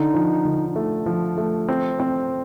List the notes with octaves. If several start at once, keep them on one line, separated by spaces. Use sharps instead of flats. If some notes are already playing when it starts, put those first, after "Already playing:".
Already playing: D3 D#4
F3
D3
A3
F3
A3
C4
C4